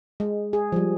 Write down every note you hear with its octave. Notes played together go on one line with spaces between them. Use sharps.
G#3
G#4
F3 G3